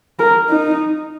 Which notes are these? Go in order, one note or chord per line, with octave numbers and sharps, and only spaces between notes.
A#4
D#4